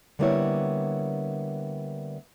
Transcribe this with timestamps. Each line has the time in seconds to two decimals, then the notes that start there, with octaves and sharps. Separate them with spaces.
0.19 D3 G3 A#3 B3 E4 C#5